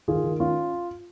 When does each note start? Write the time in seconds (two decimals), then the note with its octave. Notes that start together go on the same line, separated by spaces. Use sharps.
0.08 D#3 F4 G#4
0.24 D#3
0.40 C#4 F4